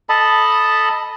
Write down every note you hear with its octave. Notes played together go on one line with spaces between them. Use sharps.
A4 D#5 A5 B5